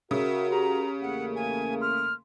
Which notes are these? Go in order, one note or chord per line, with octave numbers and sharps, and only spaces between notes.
C#3 F#4 A#4 E5
G4 A#5
E2 A3 A#3 F#5
G#5
C6 F6